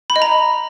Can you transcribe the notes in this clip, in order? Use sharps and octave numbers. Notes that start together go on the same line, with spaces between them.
B5
D#5
A#5